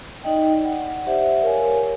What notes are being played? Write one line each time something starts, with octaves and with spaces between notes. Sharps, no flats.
D#4 D5 D#5 G5
D5 F#5
G4 C5 E5 F#5
A#4 C#5 F5 G#5